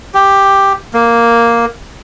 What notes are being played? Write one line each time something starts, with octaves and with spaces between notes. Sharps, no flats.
G4
A#3